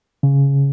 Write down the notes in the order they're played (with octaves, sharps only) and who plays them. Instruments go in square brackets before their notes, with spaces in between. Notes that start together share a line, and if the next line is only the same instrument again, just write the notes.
[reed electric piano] C#3